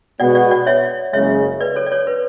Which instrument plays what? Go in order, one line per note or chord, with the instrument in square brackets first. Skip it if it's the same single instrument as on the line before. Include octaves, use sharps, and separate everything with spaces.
[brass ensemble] B2 G#3 B3 F#4 [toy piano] D5 F#5
[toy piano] D5 F#5
D5 F#5
C#5 E5
[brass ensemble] F#1 F#2 C#3 G#3 [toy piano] C#5 E5
[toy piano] B4 D5
A4 C#5
D5
A4 C#5
B4